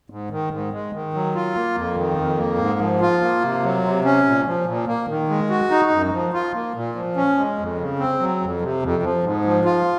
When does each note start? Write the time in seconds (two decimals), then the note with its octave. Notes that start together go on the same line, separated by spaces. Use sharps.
0.10 G#2
0.30 D#3
0.51 G#2
0.72 G#3
0.93 D#3
1.14 F#3
1.35 F4
1.55 A#3
1.76 F2
1.97 D#3
2.17 F2
2.38 A#3
2.58 G#2
2.79 F3
3.01 F4
3.22 A#3
3.42 C3
3.63 F#3
3.84 C3
4.05 C#4
4.26 A#2
4.46 F3
4.66 A#2
4.87 A#3
5.08 D#3
5.29 G#3
5.50 F#4
5.71 D#4
5.91 F#2
6.12 F3
6.33 F4
6.54 A#3
6.75 A#2
6.95 F3
7.16 C#4
7.38 G#3
7.58 F2
7.78 C#3
7.99 C4
8.19 F#3
8.41 F2
8.61 C3
8.82 F2
9.03 F3
9.24 G#2
9.45 F3
9.65 F4